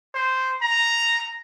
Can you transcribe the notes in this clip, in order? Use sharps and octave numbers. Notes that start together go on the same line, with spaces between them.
C5
A#5